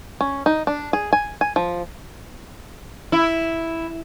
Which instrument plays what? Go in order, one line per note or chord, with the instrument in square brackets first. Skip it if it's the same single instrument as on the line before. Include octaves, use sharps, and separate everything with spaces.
[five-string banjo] C#4
D#4
D4
G#4
G#5
G#5
F3
[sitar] E4